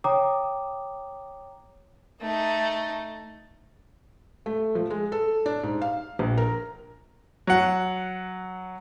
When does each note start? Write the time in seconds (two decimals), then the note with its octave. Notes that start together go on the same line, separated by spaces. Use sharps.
0.04 C#5 G5 A#5 D6 D#6
2.21 A3 D#4
4.46 A3
4.75 F3
4.90 G#3
5.12 A4
5.46 D4
5.63 G#2
5.82 F5
6.19 A#1
6.37 A#4
7.47 F#3 F#5